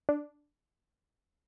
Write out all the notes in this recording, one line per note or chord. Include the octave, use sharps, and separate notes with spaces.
D4